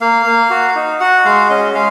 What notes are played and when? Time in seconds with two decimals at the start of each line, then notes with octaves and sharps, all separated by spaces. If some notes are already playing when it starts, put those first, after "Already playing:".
0.01 A#3 F5
0.26 A#3
0.50 F#4
0.76 D#4
1.00 F#4 F#5
1.25 G#3 F5
1.49 C#4 D#5
1.74 G#3 F5